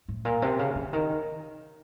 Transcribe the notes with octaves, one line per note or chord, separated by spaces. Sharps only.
A2
A#2
C3
C#3
D3
D#3